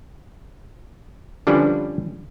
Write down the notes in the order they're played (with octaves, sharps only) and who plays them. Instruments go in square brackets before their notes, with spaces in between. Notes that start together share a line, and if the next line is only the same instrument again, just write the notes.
[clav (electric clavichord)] D3 F3 G3 C#4 D4 B4